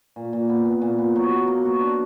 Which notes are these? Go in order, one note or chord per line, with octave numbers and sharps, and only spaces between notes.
A#2
A#2
B3
B3
A#2
B3
F#3
B3
A#3
F#4
D4